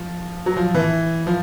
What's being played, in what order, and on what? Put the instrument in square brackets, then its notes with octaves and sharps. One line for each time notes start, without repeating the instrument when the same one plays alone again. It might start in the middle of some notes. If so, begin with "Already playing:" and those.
Already playing: [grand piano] F3
F#3
F3
E3
F3